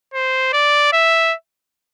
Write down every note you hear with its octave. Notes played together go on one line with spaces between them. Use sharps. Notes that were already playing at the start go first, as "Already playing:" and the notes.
C5
D5
E5